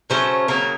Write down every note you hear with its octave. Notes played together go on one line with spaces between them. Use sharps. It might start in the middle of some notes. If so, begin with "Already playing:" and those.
C#3 F#3 A3 C#4 C5
C#3 F#3 A#3 A#4